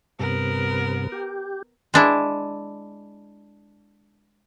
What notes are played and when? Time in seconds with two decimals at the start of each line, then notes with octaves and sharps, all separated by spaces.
0.20 G2 C3 B3 A#4
1.12 G4
1.94 G#3 D4 E4